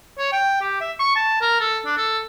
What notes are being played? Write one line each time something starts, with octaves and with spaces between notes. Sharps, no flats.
C#5
G5
G4
E5
C#6
A5
A#4
A4
D4
A4